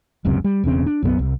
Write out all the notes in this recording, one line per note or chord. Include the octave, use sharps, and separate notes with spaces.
D#1 C#2 F#2 C3
G3
E1 E2 C#3 C4
D4
B1 F#2 F#3 B3
C2